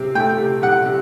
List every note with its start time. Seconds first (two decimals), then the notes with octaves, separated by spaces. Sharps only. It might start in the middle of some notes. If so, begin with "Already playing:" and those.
Already playing: C3 C4
0.15 A3 G5
0.38 C3
0.62 C3 F#5
0.86 C3